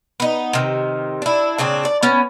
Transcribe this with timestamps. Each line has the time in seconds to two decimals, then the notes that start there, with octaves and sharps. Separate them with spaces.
0.20 B3 D#4
0.53 C3 D#3
1.22 D4 E4
1.58 A#2 C#3 C4 D4
1.85 D5
2.03 B3 C#4